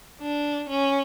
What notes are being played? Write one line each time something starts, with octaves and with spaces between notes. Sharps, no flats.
D4
C#4